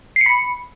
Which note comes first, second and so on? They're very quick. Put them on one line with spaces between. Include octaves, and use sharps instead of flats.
C7 C#7 B5